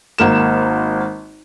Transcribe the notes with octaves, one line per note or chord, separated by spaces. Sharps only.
G#1 A#3 E7